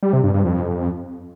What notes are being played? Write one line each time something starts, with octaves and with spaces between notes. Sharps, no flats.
G3
C3
G2
G2
F2